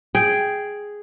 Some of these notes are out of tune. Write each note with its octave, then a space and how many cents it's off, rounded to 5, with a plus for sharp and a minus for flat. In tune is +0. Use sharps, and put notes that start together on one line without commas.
G#4 +0 G5 +0